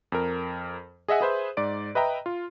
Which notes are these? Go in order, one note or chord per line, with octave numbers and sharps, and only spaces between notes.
F2 A#4
G#4 D#5 E5 F#5 G#5
G#4 B4 C5 E5
G#2 D5 D7
B4 D#5 E5 G5 A#5
F4